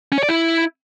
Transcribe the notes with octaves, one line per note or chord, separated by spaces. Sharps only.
C#4
C#5
D5
E4